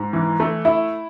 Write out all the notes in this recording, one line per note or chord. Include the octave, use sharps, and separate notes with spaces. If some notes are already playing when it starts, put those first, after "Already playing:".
Already playing: G#2
E3
A3
E4